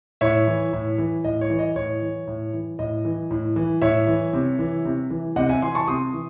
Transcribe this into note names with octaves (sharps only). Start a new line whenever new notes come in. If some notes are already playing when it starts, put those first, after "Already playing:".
A2 C#5 E5
E3
A2
E3
A2 D#5
C#5
E3
D#5
A2 C#5
E3
A2
E3
A2 D#5
E3
A2
E3
A2 C#5 E5
E3
C3
E3
C3
E3
C3 D#5 F#5
E5 G#5
E3 G#5 C6
A5 C#6
C3 C6 D#6
E3